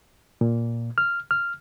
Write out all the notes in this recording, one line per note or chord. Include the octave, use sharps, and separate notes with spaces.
A#2
F6
F6